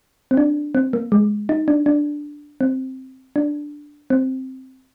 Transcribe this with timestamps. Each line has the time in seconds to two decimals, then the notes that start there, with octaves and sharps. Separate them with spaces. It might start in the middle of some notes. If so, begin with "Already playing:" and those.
0.31 C4
0.37 D4
0.75 C4
0.93 A#3
1.12 G#3
1.49 D#4
1.68 D4
1.86 D4
2.61 C4
3.36 D4
4.10 C4